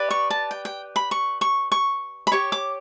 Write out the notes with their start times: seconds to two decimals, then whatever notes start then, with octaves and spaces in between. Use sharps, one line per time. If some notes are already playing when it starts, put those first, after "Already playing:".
Already playing: G4 B4 D5
0.11 C#6
0.30 A5
0.51 G5
0.65 G5
0.96 B5
1.11 C#6
1.41 C#6
1.72 C#6
2.27 B5
2.32 G4 C#5 C#6
2.52 D6